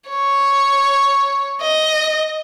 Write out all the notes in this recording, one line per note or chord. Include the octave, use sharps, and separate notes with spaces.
C#5
D#5